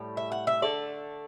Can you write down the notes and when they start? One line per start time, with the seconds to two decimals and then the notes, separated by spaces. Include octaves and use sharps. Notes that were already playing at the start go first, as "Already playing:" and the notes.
Already playing: A2 G3
0.17 E5
0.32 F#5
0.47 E5
0.62 D3 A3 D5